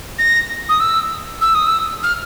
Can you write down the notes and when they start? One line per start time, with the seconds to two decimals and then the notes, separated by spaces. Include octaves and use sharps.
0.19 A#6
0.69 D#6
0.80 E6
1.41 E6
1.55 D#6
1.66 E6
2.03 F6